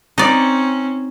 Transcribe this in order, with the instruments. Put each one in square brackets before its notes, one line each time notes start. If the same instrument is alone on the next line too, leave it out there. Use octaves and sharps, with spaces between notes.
[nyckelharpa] C4 C#4 [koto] D#4 D5